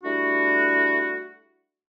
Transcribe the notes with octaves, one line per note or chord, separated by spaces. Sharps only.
G3 A3 D4 E4 F#4